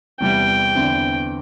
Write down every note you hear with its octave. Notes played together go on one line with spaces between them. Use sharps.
E2 C3 G3 E4 G5
E2 D3 C4 E4